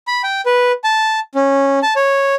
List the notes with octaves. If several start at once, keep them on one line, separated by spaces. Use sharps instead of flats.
B5
G5
B4
A5
C#4
A5
C#5